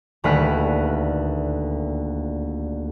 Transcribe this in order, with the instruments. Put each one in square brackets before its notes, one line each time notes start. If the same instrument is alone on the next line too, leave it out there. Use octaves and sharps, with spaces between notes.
[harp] D#1 D2 A#4 B4 F#6